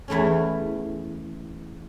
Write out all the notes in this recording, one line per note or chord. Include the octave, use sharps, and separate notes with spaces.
E2 E3 A3 C#4